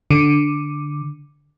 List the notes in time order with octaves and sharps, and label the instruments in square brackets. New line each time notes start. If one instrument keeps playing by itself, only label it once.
[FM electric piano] D3